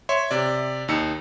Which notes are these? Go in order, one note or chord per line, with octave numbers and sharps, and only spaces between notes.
C#5 E5 C6
C3 D5
D#2 D#4 E6 C#7